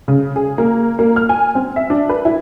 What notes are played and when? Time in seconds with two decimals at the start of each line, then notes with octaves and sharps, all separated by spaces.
0.08 C#3
0.36 G#4
0.58 A#3
0.99 A#3
1.16 F6
1.29 G#5
1.55 C4
1.76 E5
1.90 D4
2.09 B4
2.25 E4